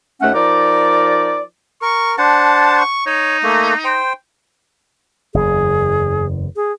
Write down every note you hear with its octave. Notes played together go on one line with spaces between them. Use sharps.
D#2 A3 C#4 F#5
F3 D#4 A#4 D5
A#4 C#6
D4 C5 F#5 A5
C#6
D#4 C#5
A3 A#3
C5 G5
F#1 E2 G#4
G#4